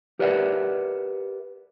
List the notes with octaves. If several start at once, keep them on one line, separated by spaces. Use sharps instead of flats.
G4 A#4 B4 D5 E5 F#5